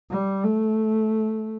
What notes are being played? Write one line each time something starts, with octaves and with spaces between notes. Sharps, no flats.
G3
A3